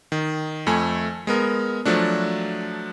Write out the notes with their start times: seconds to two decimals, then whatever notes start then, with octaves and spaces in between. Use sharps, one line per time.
0.12 D#3
0.67 F2 A3 G#5
1.27 G#3 B3 A#4
1.85 F3 F#3 A3 D4